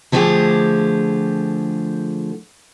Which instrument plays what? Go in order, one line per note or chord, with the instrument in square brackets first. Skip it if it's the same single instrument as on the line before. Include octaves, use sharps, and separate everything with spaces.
[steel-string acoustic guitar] D3 F3 A3 C4 G4 G#4